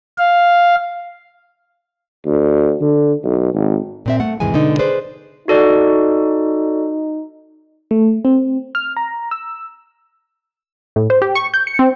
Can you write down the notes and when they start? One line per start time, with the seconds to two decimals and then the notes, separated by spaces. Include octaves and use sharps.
0.18 F5
2.26 D2
2.81 D3
3.24 B1
3.54 G#1
4.06 A#2 C4 E5
4.20 A3 F#5
4.40 D#2 G#2 C3 E3 G#3 G#5
4.53 B2 D3 G#3 D#4
4.79 G#4 B4 C5 D5
5.48 D#4 F#4 A4 D5
7.91 A3
8.25 C4
8.75 F6
8.97 A#5
9.31 E6
10.96 A2
11.10 C5
11.22 G4
11.35 C#6
11.54 G6
11.67 C#7
11.79 C4